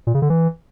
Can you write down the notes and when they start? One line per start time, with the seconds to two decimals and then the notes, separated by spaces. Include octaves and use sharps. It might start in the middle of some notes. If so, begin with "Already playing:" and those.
0.07 A#2
0.14 C#3
0.22 D3
0.30 E3